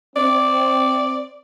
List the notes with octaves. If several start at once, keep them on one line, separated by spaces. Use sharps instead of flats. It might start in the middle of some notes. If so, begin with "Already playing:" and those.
C4 D5